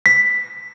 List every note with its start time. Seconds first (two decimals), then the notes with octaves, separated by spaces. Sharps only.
0.06 B6